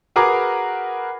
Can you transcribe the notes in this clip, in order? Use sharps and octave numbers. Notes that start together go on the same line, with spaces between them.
F#4 G#4 A#4 B4 A#5 D6